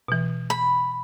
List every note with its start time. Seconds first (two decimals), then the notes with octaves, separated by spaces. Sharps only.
0.08 B2 E3
0.50 B5